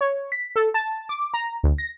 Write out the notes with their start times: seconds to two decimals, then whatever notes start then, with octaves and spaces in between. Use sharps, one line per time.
0.01 C#5
0.32 B6
0.56 A4
0.74 A5
1.09 D6
1.34 A#5
1.63 D2
1.78 A#6